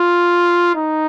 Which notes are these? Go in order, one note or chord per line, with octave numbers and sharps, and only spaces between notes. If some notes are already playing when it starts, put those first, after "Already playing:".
Already playing: F4
D#4